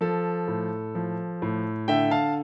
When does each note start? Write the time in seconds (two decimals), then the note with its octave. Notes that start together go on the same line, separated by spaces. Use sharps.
0.01 F3 A4
0.48 A2
0.95 F3
1.42 A2
1.88 D3 E5 G5
2.11 F5 A5